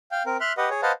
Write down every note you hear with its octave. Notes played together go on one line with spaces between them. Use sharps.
F5 G5
C4 A#4
E5 C6 F6 F#6
G4 B4 D#5 F#5
G#4 C#5
B4 C5 D#5 F5 F#5 A5